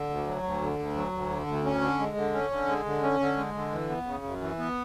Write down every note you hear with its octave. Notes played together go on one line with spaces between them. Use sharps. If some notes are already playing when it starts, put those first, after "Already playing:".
Already playing: D3
D2
F#3
D2
D3
D2
F#3
D2
D3
D2
C#4
D3
G#3
D3
C#4
D3
G#3
D3
C#4
D3
G#3
D3
E3
B3
C#3
F#2
E3
B3